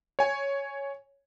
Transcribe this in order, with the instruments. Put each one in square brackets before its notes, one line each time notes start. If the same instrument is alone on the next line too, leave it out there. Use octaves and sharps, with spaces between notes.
[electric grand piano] C#5 G#5